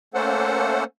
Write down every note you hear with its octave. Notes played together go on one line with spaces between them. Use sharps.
A3 A#3 C#4 A4 C5 F#5